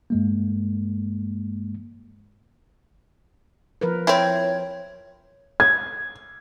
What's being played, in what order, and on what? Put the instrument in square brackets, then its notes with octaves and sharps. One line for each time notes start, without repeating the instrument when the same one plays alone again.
[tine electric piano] G2 G#3 A#3
[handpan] F3 A#4 B4
[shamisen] C4 E4 [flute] C#5
[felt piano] G#6